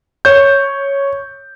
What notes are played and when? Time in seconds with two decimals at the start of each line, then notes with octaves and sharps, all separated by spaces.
0.25 C#5 G6